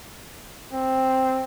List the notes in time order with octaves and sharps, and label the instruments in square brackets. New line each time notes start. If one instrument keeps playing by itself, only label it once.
[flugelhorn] C4